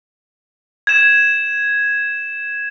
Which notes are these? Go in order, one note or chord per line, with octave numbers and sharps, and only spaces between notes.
G#6 E7